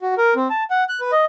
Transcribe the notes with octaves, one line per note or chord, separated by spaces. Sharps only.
F#4
A#4
C4
A5
F#5
F#6
B4
D#5